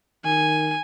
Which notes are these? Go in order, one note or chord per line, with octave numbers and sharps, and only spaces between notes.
D#3 G#5